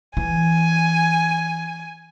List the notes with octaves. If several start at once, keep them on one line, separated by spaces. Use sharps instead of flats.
E3 G#5